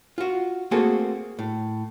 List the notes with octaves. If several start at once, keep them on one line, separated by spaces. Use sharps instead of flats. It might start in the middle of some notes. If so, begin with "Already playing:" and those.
F4 F#4
A3 A#3 C4 F#4 G#4 A4
A2